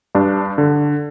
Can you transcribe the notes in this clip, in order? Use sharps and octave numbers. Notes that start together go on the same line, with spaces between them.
G2 D4
D3